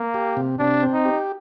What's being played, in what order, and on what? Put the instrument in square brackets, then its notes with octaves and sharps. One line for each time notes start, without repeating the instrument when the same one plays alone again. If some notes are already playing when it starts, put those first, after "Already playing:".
Already playing: [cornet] A#3
[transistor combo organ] G4
C3
[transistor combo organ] C3 [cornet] D4
[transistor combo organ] C4
[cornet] D#4
[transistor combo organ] G4